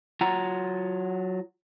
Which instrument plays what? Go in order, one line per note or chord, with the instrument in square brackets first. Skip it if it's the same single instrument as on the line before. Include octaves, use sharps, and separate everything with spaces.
[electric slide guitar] F#3 F4 F#5 A#5